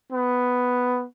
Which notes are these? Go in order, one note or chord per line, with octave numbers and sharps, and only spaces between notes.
B3